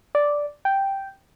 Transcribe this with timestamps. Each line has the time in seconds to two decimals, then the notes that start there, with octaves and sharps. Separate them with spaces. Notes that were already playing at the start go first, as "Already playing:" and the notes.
0.15 D5
0.65 G5